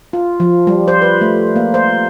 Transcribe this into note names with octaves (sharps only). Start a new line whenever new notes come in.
F4
F3
G3
C5
B4
A3
A#3
C5